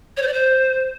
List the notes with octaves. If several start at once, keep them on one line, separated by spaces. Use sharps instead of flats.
C#5
C5
D5
C5